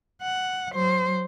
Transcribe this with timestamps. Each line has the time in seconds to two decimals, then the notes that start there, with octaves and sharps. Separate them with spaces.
0.22 F#5
0.73 F#3 C5